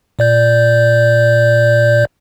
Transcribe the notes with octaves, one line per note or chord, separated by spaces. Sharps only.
A#2 D5 G6